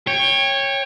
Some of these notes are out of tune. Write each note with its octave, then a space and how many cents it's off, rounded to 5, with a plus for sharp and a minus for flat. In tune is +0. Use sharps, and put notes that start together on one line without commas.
C#5 -10 G5 +20